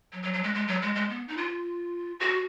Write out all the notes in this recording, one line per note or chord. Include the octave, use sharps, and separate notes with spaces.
F#3
F#3
F#3
G#3
G#3
F#3
G#3
G#3
B3
D#4
F4
F#4